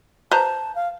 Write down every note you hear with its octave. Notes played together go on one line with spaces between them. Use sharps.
B4 C5 A5 A#5
F5